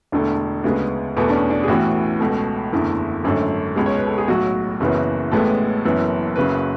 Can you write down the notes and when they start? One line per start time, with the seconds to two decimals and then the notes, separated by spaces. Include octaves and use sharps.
0.12 E1 E2 D3 A3 D4
0.64 D2 C#3 G#3 B3
1.17 E2 B2 A3 B3
1.29 D4
1.33 C#4
1.50 D4
1.64 G#4
1.68 A1 A2 E3 B3 F#4
2.20 C#2 B2 A3
2.72 F#1 E2 D3 A3 E4
3.24 G#1 F#2 D3 A3
3.76 C#2 B2 G#3
3.86 C#5
3.97 B4
4.07 A4
4.18 G#4
4.28 B1 A2 F#3 F#4
4.80 F#1 F#2 C#3 E3 B3
5.32 A1 A2 G#3 B3 A4
5.85 F#1 F#2 E3 B3
6.36 F#1 F#2 C#3 F#3 B4